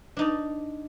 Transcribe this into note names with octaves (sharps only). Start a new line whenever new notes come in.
D4 D#4 D5